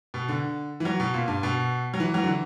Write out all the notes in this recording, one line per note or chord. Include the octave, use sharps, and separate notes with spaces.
B2
D3
E3
F#3
B2
A#2
G2
B2
F#3
E3
F#3
D3
E3